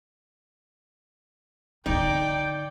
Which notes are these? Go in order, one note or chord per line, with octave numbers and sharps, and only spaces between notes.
D3 D#3 D#4 D5 G5